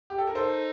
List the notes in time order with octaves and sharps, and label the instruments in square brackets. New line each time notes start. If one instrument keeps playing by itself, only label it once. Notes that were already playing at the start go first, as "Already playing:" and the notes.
[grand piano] G4
A4
A#4
[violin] D#4 [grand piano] A4 C5